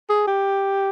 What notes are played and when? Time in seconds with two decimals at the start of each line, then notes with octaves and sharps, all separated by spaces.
0.09 G#4
0.27 G4